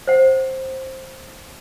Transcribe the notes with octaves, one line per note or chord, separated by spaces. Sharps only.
C5 F#5